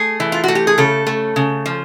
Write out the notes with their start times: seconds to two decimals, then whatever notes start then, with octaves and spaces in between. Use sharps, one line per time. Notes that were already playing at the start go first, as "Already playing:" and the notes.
Already playing: A3 G#4
0.20 E3
0.32 F4
0.44 A3 F#4
0.55 G4
0.67 G#4
0.78 C#3 A4
1.07 A3
1.36 C#3
1.66 F3